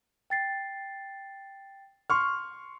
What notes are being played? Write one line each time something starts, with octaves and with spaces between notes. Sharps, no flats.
G5 A6 C7
C6 C#6 F6